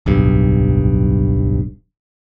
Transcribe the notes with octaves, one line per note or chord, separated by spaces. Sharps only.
D1 B1 G2